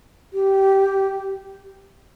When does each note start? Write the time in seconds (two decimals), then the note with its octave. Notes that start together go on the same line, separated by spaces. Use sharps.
0.33 G4